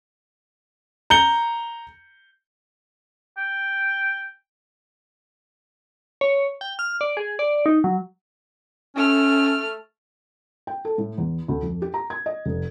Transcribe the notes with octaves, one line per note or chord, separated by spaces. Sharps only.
A#5 G6 C#7 G7
G5
C#5
G5
F6
D5
G#4
D5
D#4
F#3
A3 C#4 F6
G5
A4
A2
E2
D2
F2
G4
A#5
G#6
D#5
F1